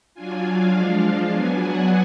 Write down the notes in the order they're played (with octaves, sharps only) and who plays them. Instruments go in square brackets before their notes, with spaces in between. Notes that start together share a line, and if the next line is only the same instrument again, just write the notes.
[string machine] F#3 D4 F4 G#5
F5
F3 G#3 D4 F4 F5
F#3 B3 D4 G#5
F#5